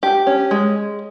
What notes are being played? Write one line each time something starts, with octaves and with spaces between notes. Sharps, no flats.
G4
C#4
G#3